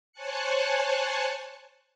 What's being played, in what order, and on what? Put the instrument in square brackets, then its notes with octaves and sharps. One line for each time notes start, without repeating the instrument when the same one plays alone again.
[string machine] C5 C#5 G#5 A5 F#6 C#7